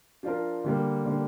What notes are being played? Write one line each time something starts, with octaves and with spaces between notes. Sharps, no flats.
F3 D4 F4 A#4
D3 G3 A#3
D3 G3 A#3